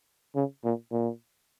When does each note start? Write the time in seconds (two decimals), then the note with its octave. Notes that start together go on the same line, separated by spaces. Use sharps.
0.36 C#3
0.64 A#2
0.92 A#2